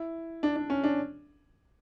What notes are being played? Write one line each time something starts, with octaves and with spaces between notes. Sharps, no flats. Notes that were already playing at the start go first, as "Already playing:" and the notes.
Already playing: E4
D4
D4
C#4
D4